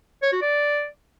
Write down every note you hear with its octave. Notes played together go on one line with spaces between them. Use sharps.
C#5
F#4
D5